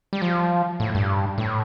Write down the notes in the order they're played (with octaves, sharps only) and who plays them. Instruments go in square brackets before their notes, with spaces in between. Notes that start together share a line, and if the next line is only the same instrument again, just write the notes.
[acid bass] G3
F3
A2
G2
A2